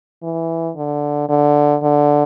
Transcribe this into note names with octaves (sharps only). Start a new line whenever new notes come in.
E3
D3
D3
D3